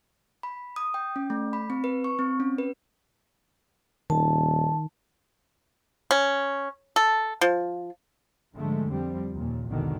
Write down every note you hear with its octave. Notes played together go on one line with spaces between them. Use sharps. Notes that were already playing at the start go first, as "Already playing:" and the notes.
B5
D#6
G5
C#4
A3
B5
C4
B4
C#6
C4
C#4
B4
D#1 D#3 A5
C#4
A4
F3
G#2 D3 F3 G#3 A3
F2 F3 G3 C4
D#2 A#2
A#1 E2 G#2 B2 D3 D#3